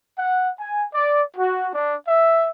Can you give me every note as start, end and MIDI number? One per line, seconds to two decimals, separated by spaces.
0.19 0.51 78
0.60 0.86 80
0.94 1.23 74
1.37 1.70 66
1.74 1.96 62
2.08 2.49 76